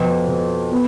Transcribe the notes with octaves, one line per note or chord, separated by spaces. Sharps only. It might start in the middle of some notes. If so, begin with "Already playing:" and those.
Already playing: F2 B2
B2
B3